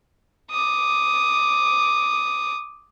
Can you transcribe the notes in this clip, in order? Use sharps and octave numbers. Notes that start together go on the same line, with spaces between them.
D6 D#6